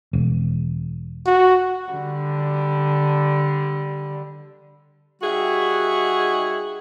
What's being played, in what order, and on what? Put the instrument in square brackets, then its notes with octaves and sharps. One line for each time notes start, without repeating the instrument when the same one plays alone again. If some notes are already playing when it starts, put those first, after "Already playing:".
[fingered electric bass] E1
[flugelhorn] F#4
[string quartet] D3 G3
[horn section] G3 D#4 F#4 G#4 E5 F#5